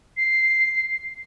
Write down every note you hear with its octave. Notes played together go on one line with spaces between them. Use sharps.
C7